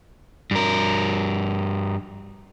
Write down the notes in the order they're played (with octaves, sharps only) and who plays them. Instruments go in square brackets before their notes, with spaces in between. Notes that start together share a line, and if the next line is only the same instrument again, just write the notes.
[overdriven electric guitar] G2 A#4